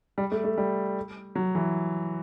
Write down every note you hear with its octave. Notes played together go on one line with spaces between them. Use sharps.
G3
A3
A3
G3
F#3
E3